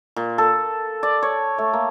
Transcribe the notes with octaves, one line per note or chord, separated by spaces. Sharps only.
A#2
A4
D5
C#5
A3
A#3